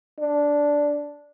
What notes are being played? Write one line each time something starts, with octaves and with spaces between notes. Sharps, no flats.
D4